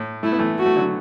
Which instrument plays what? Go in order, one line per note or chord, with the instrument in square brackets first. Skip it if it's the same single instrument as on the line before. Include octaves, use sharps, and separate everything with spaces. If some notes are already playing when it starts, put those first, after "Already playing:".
Already playing: [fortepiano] A2
[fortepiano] A3 [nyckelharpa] E4
[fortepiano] B3
E3 A3
[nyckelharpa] F#4
[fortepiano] A3
D3 F#3